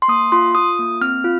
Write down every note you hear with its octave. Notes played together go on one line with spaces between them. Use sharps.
C6
A#3 D#6
F4 C6
F4 D#6
A#3
C4 F6
F4